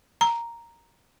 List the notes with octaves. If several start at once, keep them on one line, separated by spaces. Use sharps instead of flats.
A#5